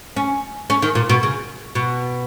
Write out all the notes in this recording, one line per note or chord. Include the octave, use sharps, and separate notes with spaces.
C#4
C#4
D#3
A#2
B2
C#3
B2